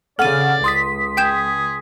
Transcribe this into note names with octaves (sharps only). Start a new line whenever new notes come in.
C#3 A4 D5 F#5 F6 D#7
C#2 C6 D#6 B6
G#4 G5 G6 E7